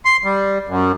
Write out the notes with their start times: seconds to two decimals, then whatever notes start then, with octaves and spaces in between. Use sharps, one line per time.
0.05 C6
0.24 G3
0.68 F#2